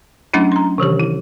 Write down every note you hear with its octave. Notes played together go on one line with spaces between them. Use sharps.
F#3 A3 C#4 D4 E4
A#5 C6
C3 D#3 E3 G4
E4